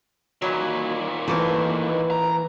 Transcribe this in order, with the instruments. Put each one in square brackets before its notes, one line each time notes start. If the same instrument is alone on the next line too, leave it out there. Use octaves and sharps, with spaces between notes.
[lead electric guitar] D#2 A#2 [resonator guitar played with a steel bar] E3 F#3
[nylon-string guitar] E3 [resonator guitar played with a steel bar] A3 A#3 C4 [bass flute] B4
[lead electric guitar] A#5